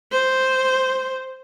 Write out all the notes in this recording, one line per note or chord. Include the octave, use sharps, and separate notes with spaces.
C5